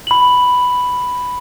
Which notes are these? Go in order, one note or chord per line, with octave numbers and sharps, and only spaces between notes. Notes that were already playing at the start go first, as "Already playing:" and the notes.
B5 F#7